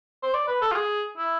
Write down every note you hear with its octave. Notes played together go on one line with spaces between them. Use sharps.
C5
D5
B4
A4
F4
G#4
E4